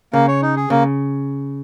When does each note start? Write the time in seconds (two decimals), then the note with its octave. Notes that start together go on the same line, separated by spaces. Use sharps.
0.13 C#3 A#3
0.28 C#5
0.42 D#4
0.56 G#4
0.70 C#3 A#3